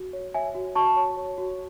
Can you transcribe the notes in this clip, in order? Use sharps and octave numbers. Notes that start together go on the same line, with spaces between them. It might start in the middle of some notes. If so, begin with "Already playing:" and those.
Already playing: F#4
C#5
C#5 E5 G#5
F#4
F#4 A5 C#6
C#5
C#5
F#4